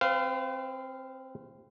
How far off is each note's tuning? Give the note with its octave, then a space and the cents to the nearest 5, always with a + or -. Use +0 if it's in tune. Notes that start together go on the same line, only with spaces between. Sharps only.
C4 +10 B4 +45 F5 -10